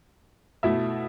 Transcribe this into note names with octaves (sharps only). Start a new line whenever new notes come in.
B2 A3 E4 E5